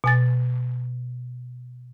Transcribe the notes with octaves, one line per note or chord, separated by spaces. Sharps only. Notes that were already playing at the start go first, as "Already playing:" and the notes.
B2 G#5 A6